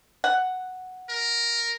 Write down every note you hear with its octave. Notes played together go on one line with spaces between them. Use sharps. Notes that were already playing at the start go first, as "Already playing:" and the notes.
F#5
A#4